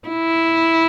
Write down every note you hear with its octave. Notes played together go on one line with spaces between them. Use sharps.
E4